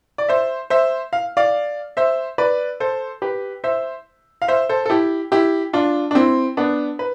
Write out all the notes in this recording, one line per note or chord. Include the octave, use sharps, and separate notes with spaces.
D5
C5 E5
C5 E5
F5
D5 F5
C5 E5
B4 D5
A4 C5
G4 B4
C5 E5
F5
C5 E5
A4 C5
A4
E4 G4
E4 G4
D4 F4
D4
C4 E4
B3 D4
B4